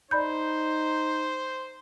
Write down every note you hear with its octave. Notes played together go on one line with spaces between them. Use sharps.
D#4 C5 D5 B5 G6